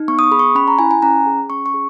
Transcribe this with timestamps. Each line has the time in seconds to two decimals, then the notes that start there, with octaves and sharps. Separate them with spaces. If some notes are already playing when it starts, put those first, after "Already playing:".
Already playing: D#4
0.08 B3 C#6
0.19 D#6
0.24 C#6
0.31 G#4 B5
0.39 C#6
0.55 C#4 B5
0.68 A#5
0.79 E4 G#5
0.91 G#5
1.02 C#4 A#5
1.26 G#4
1.50 C#4 C#6
1.66 C#6
1.74 G#4